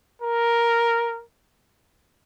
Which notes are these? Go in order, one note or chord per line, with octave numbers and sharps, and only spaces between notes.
A#4